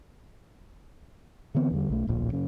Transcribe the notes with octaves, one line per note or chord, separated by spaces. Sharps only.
D3 E3 B3 C4
E2 D3 G3
B1 A3
D1 A#1 A#2
F#2 C#3